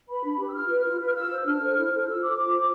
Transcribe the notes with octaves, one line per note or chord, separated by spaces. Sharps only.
B4 B5
D4
G4 B4
E6
F4 F6
B4
F4
B4
F6
F4 E6
C5
D4 F6
A4 C5
E4
A4 C5
F4 E6
C5 D6
F4
C5